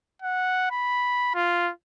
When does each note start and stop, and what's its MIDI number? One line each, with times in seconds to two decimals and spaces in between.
0.22 0.71 78
0.71 1.33 83
1.35 1.71 65